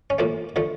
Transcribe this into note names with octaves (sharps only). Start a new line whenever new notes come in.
C#4
A2 F3 A3 A#3
D3 F3 A3